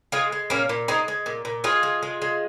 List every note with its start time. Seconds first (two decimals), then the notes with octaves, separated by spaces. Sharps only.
0.12 G#3 F4 G#4
0.32 G#3
0.50 A#2 A#3 C#4
0.69 A#2
0.88 G#3 C4 D#4
1.08 G#3
1.26 A#2
1.45 A#2
1.64 G#3 F4 G#4
1.83 G#3
2.03 G#3
2.22 G#3